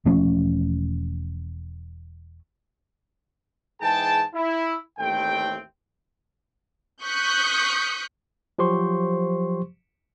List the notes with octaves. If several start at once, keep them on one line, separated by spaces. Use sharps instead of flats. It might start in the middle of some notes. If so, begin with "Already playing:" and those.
E1 F3 A3 C#4
G#2 E3 G#4 G5 A5
E4
A1 D#2 A3 C4 G5
C#6 D#6 F#6 G6 B6 C#7
F3 F#3 G4 C5 C6 C#6